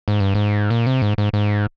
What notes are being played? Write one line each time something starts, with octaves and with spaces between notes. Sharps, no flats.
G#2
G2
G#2
A#2
C3
G#2
G#2
G#2